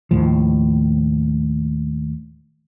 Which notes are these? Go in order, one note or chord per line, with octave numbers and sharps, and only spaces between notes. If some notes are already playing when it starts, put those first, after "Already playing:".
D#2 A2 F3